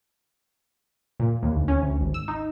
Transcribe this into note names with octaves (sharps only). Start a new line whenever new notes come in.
A#2
D#2
D2
C#4
D2
G#1
E6
D#4